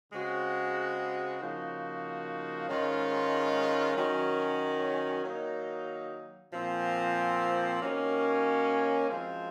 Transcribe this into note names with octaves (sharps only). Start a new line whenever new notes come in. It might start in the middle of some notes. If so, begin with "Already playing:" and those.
C#3 G#3 C4 F#4
C#3 F3 A#3 D#4 F#4
G#2 D#3 G#3 C#4 F4
F#2 D#3 F#3 C#4
D#3 F#3 A#3 D#4
A#2 F3 C4
D#3 A#3 C#4 F#4
F#2 F3 G#3 C4